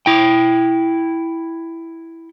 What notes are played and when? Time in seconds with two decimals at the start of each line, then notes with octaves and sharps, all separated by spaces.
0.06 E4 G5